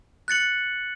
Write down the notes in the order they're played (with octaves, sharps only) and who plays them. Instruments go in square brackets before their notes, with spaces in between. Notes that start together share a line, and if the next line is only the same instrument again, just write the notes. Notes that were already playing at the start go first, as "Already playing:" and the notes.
[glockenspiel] F#6 A6 C#7 F#7